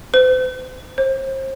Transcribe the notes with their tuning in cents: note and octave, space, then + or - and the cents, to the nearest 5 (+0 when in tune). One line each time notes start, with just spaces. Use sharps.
C5 -40
C5 +35